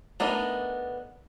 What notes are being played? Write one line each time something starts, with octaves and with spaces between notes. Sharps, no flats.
A3 B3 D4 D#4 A#4